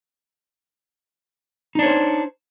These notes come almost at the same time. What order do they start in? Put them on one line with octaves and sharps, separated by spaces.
D#4 D4 C#5 C5